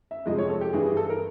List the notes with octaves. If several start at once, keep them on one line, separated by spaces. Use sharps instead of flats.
E5
F2 C3 F3 G#3 D#5
C#5
A4
G4
G2 E3 G3 G#4
G#4
A4
A#4